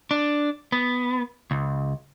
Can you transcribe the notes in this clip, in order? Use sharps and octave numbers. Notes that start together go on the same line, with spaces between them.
D4
B3
C#2